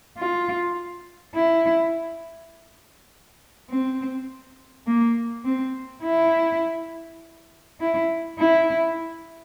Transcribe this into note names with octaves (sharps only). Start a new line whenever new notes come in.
F4
E4
C4
A#3
C4
E4
E4
E4